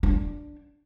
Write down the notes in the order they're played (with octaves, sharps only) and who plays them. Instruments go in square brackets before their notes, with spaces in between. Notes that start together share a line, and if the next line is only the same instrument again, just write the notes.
[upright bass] D4